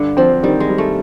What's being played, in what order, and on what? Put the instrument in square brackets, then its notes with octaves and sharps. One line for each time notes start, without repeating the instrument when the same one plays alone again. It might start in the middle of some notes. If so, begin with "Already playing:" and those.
Already playing: [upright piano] G2 [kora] D3
[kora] F3 [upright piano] C4
[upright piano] D#3 [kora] G3
[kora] G#3
[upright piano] G3
[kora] A3